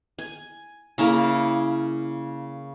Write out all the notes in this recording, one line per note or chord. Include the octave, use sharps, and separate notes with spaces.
G#5
C#3 A#3 E4 A#4